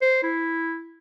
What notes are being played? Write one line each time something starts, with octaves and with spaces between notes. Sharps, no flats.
C5
E4